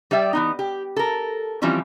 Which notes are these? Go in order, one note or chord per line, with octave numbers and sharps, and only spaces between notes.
G3 G4 D5 E5
E3 B3 D#4
G4
A4 A#4
E3 F3 G3 C4 C#4